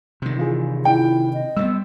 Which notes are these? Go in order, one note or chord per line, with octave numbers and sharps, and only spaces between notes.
C3 D#3
E3 F4 G#4
E4 G5
D#5
G3 G#3 B3 E6